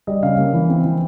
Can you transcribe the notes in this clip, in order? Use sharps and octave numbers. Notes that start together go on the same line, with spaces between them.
G3 D#5
C#3 F5
A#3
E3
C4
E3